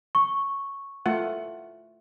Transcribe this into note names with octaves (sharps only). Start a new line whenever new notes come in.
C#6
A3 F4 F#5